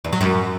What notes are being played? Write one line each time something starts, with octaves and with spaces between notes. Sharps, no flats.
E2
F#3
F#2